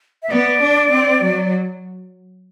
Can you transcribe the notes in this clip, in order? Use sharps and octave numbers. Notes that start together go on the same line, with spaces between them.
E5
B3 D5
D4
C4
F#3